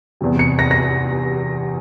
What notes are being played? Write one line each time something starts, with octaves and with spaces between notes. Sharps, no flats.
E2 C3 G3
C#7
A#6
A#6